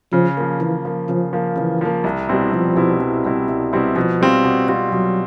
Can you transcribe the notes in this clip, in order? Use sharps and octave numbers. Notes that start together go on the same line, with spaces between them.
C#3 F3
F3 A#3
C#3 E3
F3 A#3
C#3 F3
F3 A#3
C#3 E3
F3 A#3
C2
B2 G3 C4 E4
C2 F3
B2 G3 C4 E4
C2
B2 G3 C4 E4
C2
B2 G3 C4 E4
B2 F3
G3 C4 F4
B2
G3 C4 F4
B2 F#3